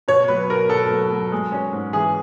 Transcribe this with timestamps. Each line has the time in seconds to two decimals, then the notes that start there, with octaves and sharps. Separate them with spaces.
0.08 B2 C#5
0.28 F#3 B4
0.49 B2 A#4
0.70 B2 A4
0.90 F#3
1.12 F#3
1.32 G#3
1.52 C#4
1.73 G#2
1.93 E3 G#4